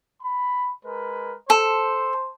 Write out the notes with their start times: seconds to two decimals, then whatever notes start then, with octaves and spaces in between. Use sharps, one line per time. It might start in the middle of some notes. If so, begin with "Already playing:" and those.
0.23 B5
0.85 G#3 A#4 B4
1.50 A4 C5